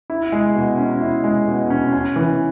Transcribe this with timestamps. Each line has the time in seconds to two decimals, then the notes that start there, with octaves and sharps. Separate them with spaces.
0.10 E4
0.32 G#3
0.56 B2
0.78 C#4
1.01 E4
1.24 G#3
1.48 B2
1.70 C#4
1.92 C#4
2.16 E3